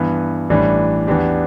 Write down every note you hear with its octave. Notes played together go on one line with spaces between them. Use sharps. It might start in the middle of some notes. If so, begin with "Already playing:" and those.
Already playing: G2 E3 B3
A1 A2 E3 G3 D4
E2 E3 B3 D4 G4